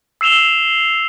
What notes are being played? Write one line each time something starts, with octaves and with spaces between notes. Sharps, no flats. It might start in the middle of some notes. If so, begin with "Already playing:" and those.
E6 C7 E7 F7 G7